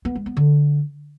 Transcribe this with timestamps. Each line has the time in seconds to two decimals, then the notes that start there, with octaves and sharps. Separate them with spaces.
0.05 B3
0.16 G#3
0.26 B3
0.37 D3